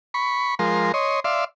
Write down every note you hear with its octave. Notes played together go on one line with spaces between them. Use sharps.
B5 C#6
F3 G#3 A#4 C6
C#5 D#5 C6
D5 E5 F5 C6